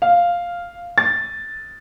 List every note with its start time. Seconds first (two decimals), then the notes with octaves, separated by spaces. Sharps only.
0.02 F5
0.98 A6